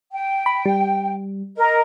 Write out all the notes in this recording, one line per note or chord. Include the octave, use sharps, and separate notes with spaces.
G5
B5
G3
A#4 D#5